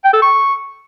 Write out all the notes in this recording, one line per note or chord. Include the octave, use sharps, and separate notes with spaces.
G5
A4
C#6